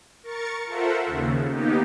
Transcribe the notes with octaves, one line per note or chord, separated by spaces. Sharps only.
A#4 C#6 A6 C#7
F4 A4 A#4 C5 E5 F#5
D#2 C#3
A#3 B3 D#4 G4